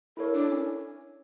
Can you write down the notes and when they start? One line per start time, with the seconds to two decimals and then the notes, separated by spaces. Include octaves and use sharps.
0.17 E4 A4 A#4 C#5
0.33 D4
0.49 C#4